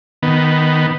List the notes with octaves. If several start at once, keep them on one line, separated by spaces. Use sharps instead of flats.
D#3 B3